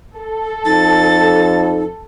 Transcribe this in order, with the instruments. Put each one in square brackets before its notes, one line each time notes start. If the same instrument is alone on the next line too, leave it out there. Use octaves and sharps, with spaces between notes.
[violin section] A4
[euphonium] F2 [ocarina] D#4 [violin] A6